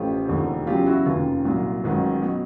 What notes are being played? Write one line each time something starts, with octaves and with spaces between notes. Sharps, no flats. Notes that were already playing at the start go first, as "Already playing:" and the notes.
Already playing: A1 A2 F3 F4 G4
E1 D#2 D3 F3
E2 C#3 F#3 F4 G4
E4 F#4
F1 D#2 C#3 F4
C2 A#2 F#3 F4
A1 G#2 D#3 F#3
B2 F#3